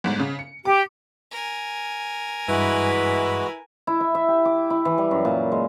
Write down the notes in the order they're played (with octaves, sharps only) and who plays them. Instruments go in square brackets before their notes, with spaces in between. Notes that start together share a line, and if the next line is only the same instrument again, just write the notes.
[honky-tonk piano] G1 G#2
C#3
C#7
[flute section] G4 [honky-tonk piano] D6
[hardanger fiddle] A#4 G#5
[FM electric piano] G2 [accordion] E3 G#3 F#4 [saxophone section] E4 B4
[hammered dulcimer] E4
E5
E5
G4
D6
E4
E3
G3
F#2
A#2
G#3